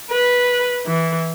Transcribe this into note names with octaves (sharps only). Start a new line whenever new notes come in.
B4
E3